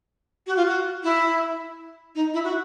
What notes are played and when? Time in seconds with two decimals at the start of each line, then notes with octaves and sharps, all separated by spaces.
0.47 F#4
0.56 F4
0.66 F#4
1.04 E4
2.15 D#4
2.34 E4
2.44 F#4